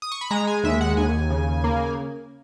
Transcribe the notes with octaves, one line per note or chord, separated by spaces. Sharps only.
D#6
C#6
B5
G#3 A#5
G#5
D#2 E5
F#5
D#2 G#5
C#3
A#3